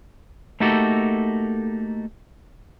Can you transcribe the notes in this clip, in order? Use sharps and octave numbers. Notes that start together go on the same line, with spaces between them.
A3 A#3 D#4 F#4 G4 A4